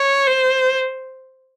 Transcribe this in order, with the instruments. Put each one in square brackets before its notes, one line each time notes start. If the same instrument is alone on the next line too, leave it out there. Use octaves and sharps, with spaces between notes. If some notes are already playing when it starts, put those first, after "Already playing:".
Already playing: [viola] C#5
C5